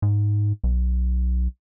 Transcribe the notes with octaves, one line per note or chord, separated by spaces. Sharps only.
G#2
B1